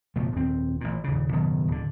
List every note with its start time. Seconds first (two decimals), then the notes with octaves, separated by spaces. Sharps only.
0.16 F#1 B2 F3 A3
0.32 D#1 C4
0.81 A1 A#2
1.04 D#1 C#3
1.32 F#1 B2 D#3 F#3
1.68 D1 D3